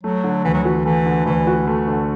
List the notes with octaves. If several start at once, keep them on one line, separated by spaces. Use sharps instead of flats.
F#3 A3
D3
D2 E3
F#3
E3 F#4
E3 A3
D3
D2 E3
F#4
E3 A3
D3